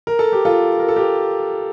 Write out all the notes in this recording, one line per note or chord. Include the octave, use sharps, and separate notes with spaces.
A#4
A4
G4
F4 A4
A#4
A4
G4 A#4